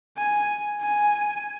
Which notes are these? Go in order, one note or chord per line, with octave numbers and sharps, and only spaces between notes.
G#5
G#5